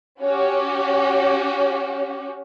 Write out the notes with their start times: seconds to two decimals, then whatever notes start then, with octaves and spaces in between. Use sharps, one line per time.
0.21 C#4 F#4 G4